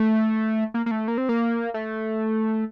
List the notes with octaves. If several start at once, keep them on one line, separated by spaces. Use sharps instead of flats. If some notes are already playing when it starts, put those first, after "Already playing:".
Already playing: A3
A#3
A#3
A3
A#3
C4
A#3
A3